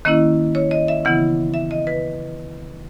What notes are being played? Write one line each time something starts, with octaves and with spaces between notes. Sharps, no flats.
D#3 A#3 C#4 E4 D#5
C#5
D#5
E5
C#3 E3 B3 E4 F#5
E5
D#5
B4